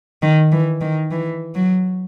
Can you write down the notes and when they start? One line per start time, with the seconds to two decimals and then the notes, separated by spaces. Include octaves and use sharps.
0.23 D#3
0.52 E3
0.81 D#3
1.11 E3
1.55 F#3